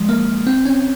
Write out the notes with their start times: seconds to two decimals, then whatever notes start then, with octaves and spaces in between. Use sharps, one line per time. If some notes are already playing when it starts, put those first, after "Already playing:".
Already playing: F3 G#3
0.09 A#3
0.47 C4
0.65 C#4